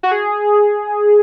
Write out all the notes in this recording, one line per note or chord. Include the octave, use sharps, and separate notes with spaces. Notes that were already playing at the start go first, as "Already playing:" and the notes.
F#4
G#4